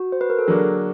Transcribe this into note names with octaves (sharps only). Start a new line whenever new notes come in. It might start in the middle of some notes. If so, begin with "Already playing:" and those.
Already playing: F#4
C5
B4
A#4
A4
D3 F#3 A#3 D4 G#4